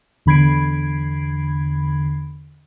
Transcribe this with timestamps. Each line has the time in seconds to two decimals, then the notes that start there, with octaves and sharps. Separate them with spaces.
0.26 E2 D3 B5 G#6 C7 D7